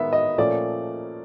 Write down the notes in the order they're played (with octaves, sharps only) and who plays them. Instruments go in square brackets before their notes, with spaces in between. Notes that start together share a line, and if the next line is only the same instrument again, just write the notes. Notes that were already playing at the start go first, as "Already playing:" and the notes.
Already playing: [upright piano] D#3 G#3 B3 E5
D#5
A#2 F3 A3 C#4 D5